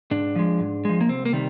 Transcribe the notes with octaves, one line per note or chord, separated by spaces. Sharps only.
G#2 D4
F3 G#3
G#2
F3 G#3
A#3
C2 C4
A#3
C3 D#3 G3